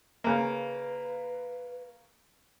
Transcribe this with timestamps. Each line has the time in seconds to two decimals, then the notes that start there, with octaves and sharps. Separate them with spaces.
0.24 C#3 A#3 B4